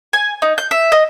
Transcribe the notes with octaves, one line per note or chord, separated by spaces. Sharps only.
G#5
D#4
G6
E5
D#5